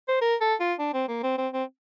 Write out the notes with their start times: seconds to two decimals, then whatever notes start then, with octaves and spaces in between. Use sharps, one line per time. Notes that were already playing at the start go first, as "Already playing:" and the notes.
0.08 C5
0.21 A#4
0.41 A4
0.60 F4
0.79 D4
0.94 C4
1.09 A#3
1.23 C4
1.38 C4
1.53 C4